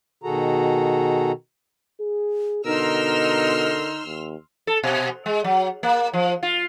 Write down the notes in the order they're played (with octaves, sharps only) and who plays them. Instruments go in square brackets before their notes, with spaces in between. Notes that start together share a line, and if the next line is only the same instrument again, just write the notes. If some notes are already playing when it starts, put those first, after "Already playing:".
[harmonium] B2 D#3 F#4 G#4 A4 A#5
[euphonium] G#4
[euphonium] B2 [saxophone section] D3 A#4 [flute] D#4 [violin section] C6 E6 F6
[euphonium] D#2
[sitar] A4
B2
G#3
F#3
A#3
F3
F4